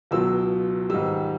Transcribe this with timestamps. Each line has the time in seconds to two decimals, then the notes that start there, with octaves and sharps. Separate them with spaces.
0.11 C#2 B2 F#3 E6
0.90 G#2 D#3 G3 E6